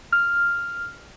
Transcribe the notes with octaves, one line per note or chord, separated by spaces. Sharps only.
F6